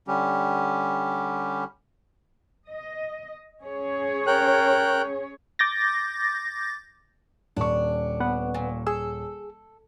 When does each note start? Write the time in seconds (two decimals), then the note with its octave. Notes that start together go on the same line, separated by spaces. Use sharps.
0.08 D3 G3 C#4 G4
2.70 D#5
3.62 C#4 G#4 C#5
4.27 A#4 G5 F#6
5.59 D6 G6 A6 A#6
7.57 D#1 D4 C#6
8.20 B3 B4 F#5
8.54 A#2
8.87 G#4 A4 E6